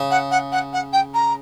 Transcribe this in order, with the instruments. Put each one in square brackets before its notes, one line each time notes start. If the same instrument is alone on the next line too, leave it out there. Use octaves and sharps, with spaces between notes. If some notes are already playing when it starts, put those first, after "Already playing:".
Already playing: [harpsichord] C#3
[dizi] F#5
F#5
F#5
F#5
G5
A#5